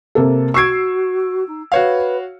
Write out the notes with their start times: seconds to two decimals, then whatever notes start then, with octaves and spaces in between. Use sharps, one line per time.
0.15 C3 A#3 A4
0.54 F#4 C#6 E6 G#6 C7 D7
1.47 D#4
1.72 F#4 B4 C#5 F5